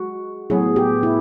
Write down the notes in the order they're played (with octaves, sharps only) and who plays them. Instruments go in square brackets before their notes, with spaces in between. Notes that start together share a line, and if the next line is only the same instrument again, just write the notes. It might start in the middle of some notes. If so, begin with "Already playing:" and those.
Already playing: [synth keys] G#3 [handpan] F#4
[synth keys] A2 F#3 B3 [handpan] G#4
[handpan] G4
E4